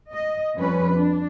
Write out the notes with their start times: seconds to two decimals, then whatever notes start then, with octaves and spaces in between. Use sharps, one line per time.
0.13 D#5
0.56 F2 G3 C#4 B4
0.94 D4